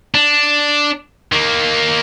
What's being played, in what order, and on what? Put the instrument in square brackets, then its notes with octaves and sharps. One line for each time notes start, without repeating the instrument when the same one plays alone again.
[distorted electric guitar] D4
D#3 A#3